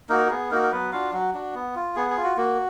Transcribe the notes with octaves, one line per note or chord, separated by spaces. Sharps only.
A#3 D#4 F#4 A#4
F#4
B3 G#4
A#3 D#4 F#4 A#4
A#4
F#3 B3 B4
D4 F4 F#4 F5
F#3 F#4
D4 F#4
B3
F4
B3 G#4
G#4
F4
F#4
A#3 F#4